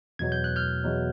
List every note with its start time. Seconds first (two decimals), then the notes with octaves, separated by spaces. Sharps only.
0.19 E2 B2 F#3 G#6
0.32 G6
0.44 F#6
0.56 F6 G6
0.84 E2 B2 F#3